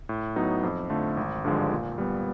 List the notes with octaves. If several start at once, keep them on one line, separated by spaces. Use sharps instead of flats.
A2
F#3 B3 D#4
F2
D3 F3 A3
G#1
G2 D3 F3 G#3
A#2
G3 B3